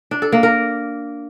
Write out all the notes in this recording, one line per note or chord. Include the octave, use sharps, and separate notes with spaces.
D4
A4
A#3
A#4